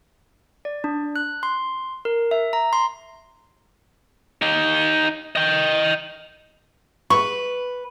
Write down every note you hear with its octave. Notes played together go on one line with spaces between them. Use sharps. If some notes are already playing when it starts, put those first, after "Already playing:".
D5
D4
F#6
C6
A#4
E5
A#5
C6
D#4 G4
D#5 G5
B4 C#6